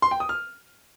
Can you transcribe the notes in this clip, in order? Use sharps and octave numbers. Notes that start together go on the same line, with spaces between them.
C6
G5
D#6
F6